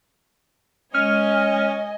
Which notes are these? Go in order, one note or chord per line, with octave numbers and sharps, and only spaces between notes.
G#3 C#4 D#5 G#5 F6